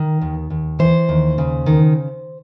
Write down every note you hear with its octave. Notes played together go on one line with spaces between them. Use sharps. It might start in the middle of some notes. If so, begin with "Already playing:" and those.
Already playing: D#3
D#2
D#2
E3 C5
D#2
C#3
D#3